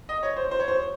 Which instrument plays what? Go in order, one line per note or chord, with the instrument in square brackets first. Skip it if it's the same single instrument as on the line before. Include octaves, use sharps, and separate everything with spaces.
[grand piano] D#5
C#5
C5
C5
C#5
C5